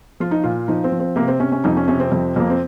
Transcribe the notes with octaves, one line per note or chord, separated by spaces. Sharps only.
F3 F4
D#4
A#2 F4
F3 D#4
C4
F3
C4
C3 A#3
C4
C3 C#4
C#4
F2 D#4
C#4
C3 C#4
C4
F2
F2 A#3
C4